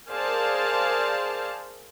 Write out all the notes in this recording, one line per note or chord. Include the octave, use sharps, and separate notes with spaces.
G#4 A#4 C5 D5 F5 A5